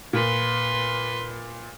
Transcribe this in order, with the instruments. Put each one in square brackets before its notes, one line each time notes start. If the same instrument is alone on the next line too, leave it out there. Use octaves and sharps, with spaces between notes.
[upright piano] A#2 [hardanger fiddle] B4 C6